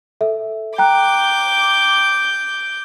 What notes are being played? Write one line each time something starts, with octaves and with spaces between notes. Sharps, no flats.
A4 E5
G5 A#5 D6 F#6 G6